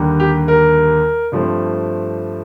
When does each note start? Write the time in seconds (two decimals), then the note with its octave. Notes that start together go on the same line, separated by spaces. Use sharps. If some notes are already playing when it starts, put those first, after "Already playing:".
Already playing: D#2 D3 G3 A#3
0.20 G4
0.48 A#4
1.32 G2 F3 A3 C4